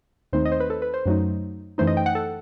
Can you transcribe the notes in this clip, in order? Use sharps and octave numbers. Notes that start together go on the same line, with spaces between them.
D#2 D#3 A3 C4 D#4 C5
D#5
C5
B4
A4
B4
C5
F#2 F#3 A3 D#4
F#2 E3 A3 D#4 C5
D#5
G5
F#5
A4